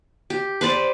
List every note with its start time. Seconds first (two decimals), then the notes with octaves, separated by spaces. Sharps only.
0.30 G4
0.61 B4 C5 D5